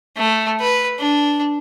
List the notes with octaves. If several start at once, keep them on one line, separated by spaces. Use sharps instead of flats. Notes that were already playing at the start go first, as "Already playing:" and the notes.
A3
B4
D4